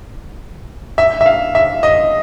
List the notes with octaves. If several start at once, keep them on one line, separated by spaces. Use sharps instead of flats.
E5
E5
F5
E5
D#5